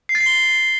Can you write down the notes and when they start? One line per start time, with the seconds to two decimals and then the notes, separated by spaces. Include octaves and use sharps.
0.09 C7
0.15 A6
0.21 C7
0.26 G7